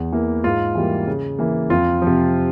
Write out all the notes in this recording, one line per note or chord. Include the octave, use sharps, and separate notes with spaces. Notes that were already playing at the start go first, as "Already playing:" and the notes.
Already playing: E2
E3 A#3 E4
G#2 F4
E3 G3 A#3
C#3
E3 A#3
F2 F4
F3
C3